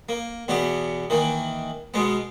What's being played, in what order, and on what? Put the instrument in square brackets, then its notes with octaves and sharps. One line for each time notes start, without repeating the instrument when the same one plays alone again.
[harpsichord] A#3
E2 B2 B3 G4
D#3 E3 A#3
B2 G#3 B3